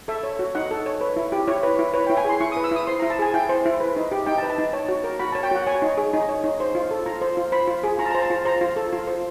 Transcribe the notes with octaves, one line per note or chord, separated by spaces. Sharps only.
A4 E5
C#5
F#4
D#4 F#5
A4
C#5
B4
E4
G4
E4 C#5
B4
E4
B4 C#5
G5
E4
G#5
G#4 C6
E4 C#6
D#6
B4
E6
E4 D#6
C5 C6
E4 A#5
A5
G#4 G#5
E4 G5
C5
E4
B4
D#4
G4
D#4 G5
A5
B4
A5
D#4
C#5 A5
F#4
A#4
F#4 B5
C#5 A5
G5
F#4 F#5
C#5 G#5
D#4
G#4
D#4
C#5
D#4
C5
F4
A4
F4 A#5
C5
F4
C5 B5
F4
G#4
F4 A#5
A5
A#5
C5
A5
F4
C5 A#5
F4
A4
F4
C5